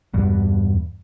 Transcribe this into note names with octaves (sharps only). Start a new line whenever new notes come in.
E2 G2 B2